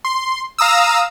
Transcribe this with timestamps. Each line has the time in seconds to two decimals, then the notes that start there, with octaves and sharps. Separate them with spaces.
0.05 C6
0.58 F5 A#5 D#6 E6